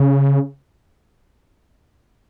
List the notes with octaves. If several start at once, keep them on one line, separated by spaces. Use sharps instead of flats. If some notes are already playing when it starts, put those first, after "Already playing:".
Already playing: C#3